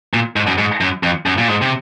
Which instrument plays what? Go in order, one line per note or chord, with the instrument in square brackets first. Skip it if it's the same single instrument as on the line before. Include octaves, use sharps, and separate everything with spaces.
[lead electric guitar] A#2
G#2
F#2
G#2
F#2
F2
F#2
A#2
G#2
C3